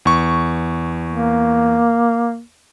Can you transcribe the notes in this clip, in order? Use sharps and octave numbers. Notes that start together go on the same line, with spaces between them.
E2 C#6
A#3